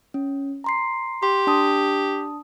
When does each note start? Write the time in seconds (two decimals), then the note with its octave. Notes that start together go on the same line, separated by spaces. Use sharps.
0.14 C#4
0.64 A#5 C6 C7
1.23 G4 C6
1.47 D4 A5 D#6